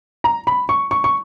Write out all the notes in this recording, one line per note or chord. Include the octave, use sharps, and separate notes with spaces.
A#5
B5
C#6
C#6
C#6